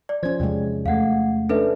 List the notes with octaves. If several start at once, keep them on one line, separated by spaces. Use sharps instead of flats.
D5
F3 C#4 C5 G#6
E2 C3 G#3
E2 A3 F5 F#5
C#4 D4 A4 B4 E5